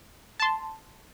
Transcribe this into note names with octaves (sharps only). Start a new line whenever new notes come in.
A5 C6